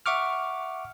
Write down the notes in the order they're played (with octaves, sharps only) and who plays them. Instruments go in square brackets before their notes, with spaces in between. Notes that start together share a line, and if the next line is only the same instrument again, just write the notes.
[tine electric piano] E5 F#5 C#6 D6 F6